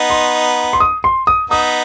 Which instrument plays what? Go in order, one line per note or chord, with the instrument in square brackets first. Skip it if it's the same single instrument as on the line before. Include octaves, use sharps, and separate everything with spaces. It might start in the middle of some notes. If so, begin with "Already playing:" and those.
Already playing: [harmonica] B3 D#4
[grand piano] C6
C6
D#6
C6
D#6
[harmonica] B3 D#4 [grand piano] D#6